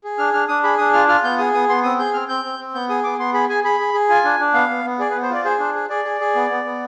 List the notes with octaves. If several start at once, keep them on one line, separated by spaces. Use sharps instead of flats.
G#4
D4 F6
D4 F6
D4 D#6
G#4 B5
D4 D#6
F4 F6
F4 F6
B3 G6
G#4 D#6
B3 D#6
B3 C6
C4 D#6
G#4 G6
C4 F6
C4 G6
C4
C4
B3 G6
G#4 D#6
B3 D6
B3 C6
G#4 B5
G#4 G#5
G#4 B5
G#4
G#4
F4 G#5
D4
D4
B3 F5
B3
B3
G#4 D5
B4
B3
C5
F4 D5
G#4 C5
D4 C5
G#4
G#4 D5
G#4
G#4
B3
B3
B3